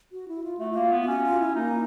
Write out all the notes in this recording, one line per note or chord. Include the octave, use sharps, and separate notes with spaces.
F#4
E4
F4
A3 F#4
F4
A#3
B3
F4
C#4 F#4
F4
E4
A#3 D#4